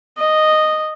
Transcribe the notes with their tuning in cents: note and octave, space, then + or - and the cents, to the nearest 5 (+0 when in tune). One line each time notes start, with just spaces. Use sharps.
D#5 -5